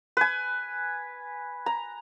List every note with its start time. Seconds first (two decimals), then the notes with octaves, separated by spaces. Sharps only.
0.17 B4 G#5
1.66 A#5